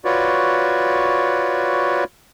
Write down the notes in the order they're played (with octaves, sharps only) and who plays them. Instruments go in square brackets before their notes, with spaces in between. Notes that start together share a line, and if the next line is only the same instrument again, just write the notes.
[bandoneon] F4 F#4 B4 C#5 D5